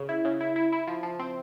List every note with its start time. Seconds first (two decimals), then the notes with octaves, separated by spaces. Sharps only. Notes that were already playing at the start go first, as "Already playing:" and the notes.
Already playing: C#3
0.09 E4
0.25 C#3
0.41 E4
0.56 E4
0.72 E4
0.87 F3
1.03 F3
1.19 C4